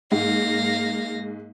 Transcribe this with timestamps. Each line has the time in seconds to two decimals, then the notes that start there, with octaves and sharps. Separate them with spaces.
0.12 G#2 A#3 F5 A#6